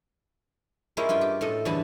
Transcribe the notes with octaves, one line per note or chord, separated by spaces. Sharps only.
G#3 A#3 C#4 E4 F4 G4
G2 F4 G5 G#5
G4
A2 A4 D#5
E2 G2 D3 G#5 A5 B5